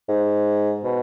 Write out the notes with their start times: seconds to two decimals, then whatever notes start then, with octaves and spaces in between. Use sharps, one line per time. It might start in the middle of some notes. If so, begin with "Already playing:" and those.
0.08 G#2
0.84 B2